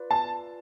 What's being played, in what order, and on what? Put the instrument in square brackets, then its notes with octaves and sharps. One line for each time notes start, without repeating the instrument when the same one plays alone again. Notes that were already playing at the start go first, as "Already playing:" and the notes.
Already playing: [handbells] F4 B4 D5
[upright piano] A5